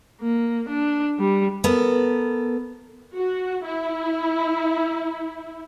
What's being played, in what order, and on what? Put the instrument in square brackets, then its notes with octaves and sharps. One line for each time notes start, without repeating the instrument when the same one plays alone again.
[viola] A#3
D4
G3
[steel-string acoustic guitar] B3 A4 A#4
[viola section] F#4
E4